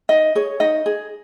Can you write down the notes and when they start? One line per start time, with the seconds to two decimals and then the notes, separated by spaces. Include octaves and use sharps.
0.09 D#4 D#5
0.35 G#4 C#5
0.60 D#4 D#5
0.86 G#4